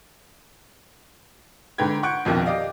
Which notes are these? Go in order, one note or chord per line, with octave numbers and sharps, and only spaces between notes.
G#2 D3 B4 G5 G#6
F#5 C#6 F#6 G6 D7
A#1 F2 B2 D#3
G4 D5 D#5 F5